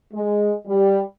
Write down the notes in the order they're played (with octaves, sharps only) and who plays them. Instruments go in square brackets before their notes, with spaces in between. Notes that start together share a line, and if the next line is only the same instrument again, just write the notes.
[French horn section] G#3
G3